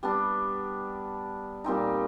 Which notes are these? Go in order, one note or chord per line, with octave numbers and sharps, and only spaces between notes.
G3 B3 D4
A#2 G3 C4 D#4